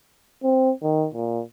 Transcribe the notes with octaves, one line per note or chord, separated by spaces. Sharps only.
C4
D#3
A#2